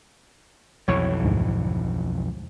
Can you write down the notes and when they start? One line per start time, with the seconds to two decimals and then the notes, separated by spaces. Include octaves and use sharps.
0.88 B1 F2 E3 C#5
1.23 D2 G#2